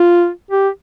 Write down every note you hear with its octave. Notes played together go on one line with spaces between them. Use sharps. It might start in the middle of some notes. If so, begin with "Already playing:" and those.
Already playing: F4
G4